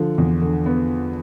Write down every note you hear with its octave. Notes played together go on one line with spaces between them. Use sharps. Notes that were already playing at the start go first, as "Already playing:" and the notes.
Already playing: D3 F3
E2
D3
B3